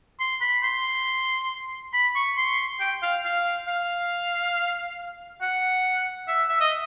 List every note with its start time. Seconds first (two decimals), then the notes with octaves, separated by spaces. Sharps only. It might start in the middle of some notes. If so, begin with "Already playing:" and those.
0.20 C6
0.41 B5
0.63 C6
1.93 B5
2.15 C#6
2.38 C6
2.80 G5
3.03 F5
3.25 F5
3.68 F5
5.42 F#5
6.28 E5
6.49 E5
6.60 D#5